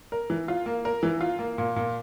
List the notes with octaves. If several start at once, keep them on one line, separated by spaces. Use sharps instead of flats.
A#4
E3
F4
A#3
A#4
E3
F4
A#3
A#2
A#2